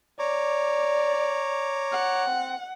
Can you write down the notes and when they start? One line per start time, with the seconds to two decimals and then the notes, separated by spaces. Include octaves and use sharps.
0.19 C#5 D5 A#5 D6
1.92 F#5
2.26 C4